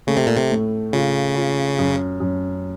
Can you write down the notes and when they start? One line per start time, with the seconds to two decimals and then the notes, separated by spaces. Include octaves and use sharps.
0.07 C#3 A3
0.17 C3
0.27 A#2
0.36 C3
0.51 A2
0.93 C#3 F4
1.35 F4
1.79 F#2
2.20 F#2